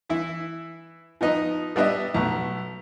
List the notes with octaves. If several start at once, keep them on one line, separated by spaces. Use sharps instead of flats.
E3 E4
F3 B3 D#4
G3 B3 D4 D#5 E5
B1 A3 B3